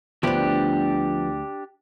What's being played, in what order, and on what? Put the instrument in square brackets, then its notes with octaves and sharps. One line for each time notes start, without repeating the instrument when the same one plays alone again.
[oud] D2 B4 [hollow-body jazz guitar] F3 B3 [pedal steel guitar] D4 G4